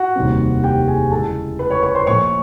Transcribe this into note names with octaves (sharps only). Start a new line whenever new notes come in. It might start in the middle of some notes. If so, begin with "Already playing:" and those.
Already playing: F#4 F#5
F1 D#2 D#3 G3 C4
G4 G5
G#4 G#5
E2 C#3 E3 G#3 A4 A5
B4 B5
C#5 C#6
C#5 C#6
C5 C6
A#1 A#2 F3 A3 C#5 C#6